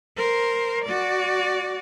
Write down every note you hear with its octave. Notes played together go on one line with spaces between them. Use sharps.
A#4 C5
F#4 D5